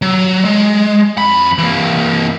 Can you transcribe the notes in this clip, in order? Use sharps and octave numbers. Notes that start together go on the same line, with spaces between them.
F#3
G#3
F2 B5
E3 A#3